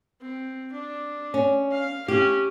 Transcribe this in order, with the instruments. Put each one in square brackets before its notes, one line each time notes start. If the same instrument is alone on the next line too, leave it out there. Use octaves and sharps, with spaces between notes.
[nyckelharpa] C4
D4
[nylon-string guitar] C#4
[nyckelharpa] F5
[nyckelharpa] C#4 [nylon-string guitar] G4